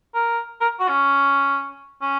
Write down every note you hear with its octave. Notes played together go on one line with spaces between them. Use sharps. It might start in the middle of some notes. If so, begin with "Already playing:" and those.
A#4
A#4
F#4
C#4
C#4